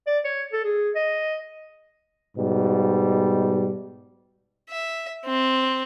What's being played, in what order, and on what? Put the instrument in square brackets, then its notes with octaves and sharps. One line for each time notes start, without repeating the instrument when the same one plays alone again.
[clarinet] D5
C#5
A4
G#4
D#5
[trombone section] G#2 B2 G3
[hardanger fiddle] E5
C4